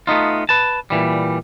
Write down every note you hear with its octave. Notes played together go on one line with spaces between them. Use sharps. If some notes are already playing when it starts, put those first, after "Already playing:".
A3 B3 D#4 F4
B4 A5
A#2 E3 G3